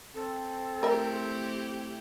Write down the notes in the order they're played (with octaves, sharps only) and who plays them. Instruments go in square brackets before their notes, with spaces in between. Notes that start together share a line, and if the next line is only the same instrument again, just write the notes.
[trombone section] C4 [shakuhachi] A4
[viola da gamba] A3 E4 G4 [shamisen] A#4 E5